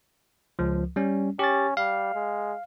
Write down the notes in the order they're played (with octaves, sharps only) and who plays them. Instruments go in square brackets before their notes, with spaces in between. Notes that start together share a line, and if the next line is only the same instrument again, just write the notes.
[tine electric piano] C#2 F3
G3 C#4
[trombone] C#4 [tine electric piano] G4 A6
[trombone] G3 [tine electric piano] F5
[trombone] G#3